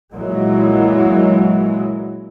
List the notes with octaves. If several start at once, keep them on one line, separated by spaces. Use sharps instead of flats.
A#2 E3 F#3 G#3